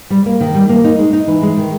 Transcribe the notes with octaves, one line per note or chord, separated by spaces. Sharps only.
G3
A#3
D#3
G3
A#3
D#4
G#3
D#4
E3
G#3
D#3